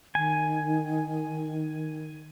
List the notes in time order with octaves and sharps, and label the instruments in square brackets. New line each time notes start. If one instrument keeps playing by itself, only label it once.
[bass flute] D#3 [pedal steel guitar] G#5